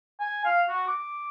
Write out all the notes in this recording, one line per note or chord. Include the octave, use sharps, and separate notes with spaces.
G#5
F5
F#4
D6